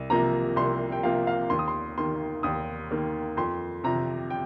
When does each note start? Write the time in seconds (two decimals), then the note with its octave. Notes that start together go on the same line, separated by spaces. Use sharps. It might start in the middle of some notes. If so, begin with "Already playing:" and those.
Already playing: C2
0.10 C3 F3 A#3 A#5
0.56 C2 C6
0.92 G5
1.03 C3 F3 A#3 F5
1.27 F5
1.50 D#2 C6
1.59 D#6
1.68 C6
1.98 D#3 A#3 C6
2.43 D#2 D#6
2.91 D#3 A#3
3.37 F2 C6
3.84 C3 F3 A#5
4.30 G5